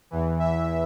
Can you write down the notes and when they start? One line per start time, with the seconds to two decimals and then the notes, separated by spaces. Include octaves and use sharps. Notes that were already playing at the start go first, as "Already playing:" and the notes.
0.11 E2 E3
0.39 E5